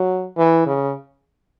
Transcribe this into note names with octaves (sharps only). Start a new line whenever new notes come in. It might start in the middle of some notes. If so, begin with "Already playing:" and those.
Already playing: F#3
E3
C#3